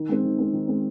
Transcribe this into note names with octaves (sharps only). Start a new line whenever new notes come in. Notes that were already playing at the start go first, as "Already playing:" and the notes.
Already playing: D#3
G#3 C4
D#3
G#3 C4
D#3
G#3 C4